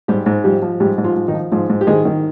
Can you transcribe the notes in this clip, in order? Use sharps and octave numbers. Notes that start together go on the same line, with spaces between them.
G#2 G3 G4
G#2
F3 G3 G4
F3
G#2 G3 G4
G#2
F3 F4
F3
D#3 D#4
F3
G#2 F3 F4
G#2
G4
D#3 G#3 G#4
D#3